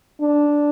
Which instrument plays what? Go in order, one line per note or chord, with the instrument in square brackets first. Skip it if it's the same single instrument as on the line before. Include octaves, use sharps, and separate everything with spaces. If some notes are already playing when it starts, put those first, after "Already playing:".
[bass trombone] D4